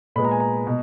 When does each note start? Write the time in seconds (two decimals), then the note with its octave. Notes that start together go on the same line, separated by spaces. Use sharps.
0.16 A#2 G#3 B3 B5
0.25 A#5
0.31 G#5
0.40 A#5
0.67 B2